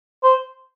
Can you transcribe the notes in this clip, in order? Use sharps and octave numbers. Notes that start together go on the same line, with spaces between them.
C5